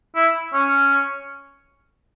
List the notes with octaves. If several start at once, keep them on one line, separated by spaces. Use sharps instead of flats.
E4
C#4